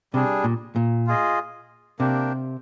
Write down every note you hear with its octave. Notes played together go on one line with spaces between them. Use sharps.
C3 G3 D4 G#4
A#2
A#2
F4 G#4 D#5
C3 A#3 D4 G4